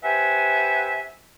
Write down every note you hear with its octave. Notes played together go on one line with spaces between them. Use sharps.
G4 B4 C5 E5 F#5 G#5